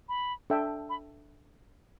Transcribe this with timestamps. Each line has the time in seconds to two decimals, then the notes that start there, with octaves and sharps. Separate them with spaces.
0.09 B5
0.50 D4 A4 E5 G5
0.90 B5